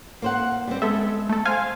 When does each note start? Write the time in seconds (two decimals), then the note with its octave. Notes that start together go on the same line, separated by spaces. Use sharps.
0.22 A#3 C5 F#5
0.67 G3 C4
0.82 G#3 B3 A4 E5
1.29 A3 A4
1.45 C5 F5 G#5